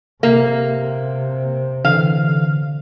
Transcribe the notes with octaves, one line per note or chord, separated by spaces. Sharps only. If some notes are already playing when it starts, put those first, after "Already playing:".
C3 A#3 E5
D3 E3 F5